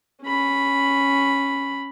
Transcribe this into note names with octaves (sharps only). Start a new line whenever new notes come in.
C#4 B5